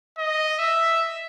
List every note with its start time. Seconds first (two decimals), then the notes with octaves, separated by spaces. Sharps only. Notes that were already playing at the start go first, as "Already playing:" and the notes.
0.18 D#5
0.59 E5